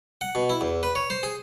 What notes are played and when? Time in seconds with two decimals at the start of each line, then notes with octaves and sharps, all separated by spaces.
0.21 F#5
0.35 B2
0.49 E4
0.61 E2
0.83 B4
0.95 C#5
1.10 C5
1.23 G#4